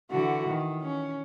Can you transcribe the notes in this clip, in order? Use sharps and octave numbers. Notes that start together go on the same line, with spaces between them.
D3 E3 F#4
D#3
C#4